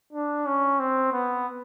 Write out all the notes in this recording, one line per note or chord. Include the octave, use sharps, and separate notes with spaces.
D4
C#4
C4
B3